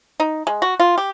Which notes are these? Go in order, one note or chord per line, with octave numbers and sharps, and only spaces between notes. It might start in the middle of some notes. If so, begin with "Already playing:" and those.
D#4
G#3
F#4
F4
G4